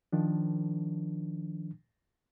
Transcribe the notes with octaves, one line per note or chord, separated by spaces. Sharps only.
D#3 F3 D4